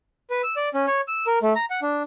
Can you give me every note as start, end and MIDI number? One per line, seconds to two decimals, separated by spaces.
0.30 0.42 71
0.43 0.55 88
0.56 0.69 74
0.74 0.86 61
0.87 1.01 73
1.08 1.26 88
1.27 1.39 70
1.43 1.54 57
1.56 1.65 82
1.70 1.80 78
1.82 2.03 62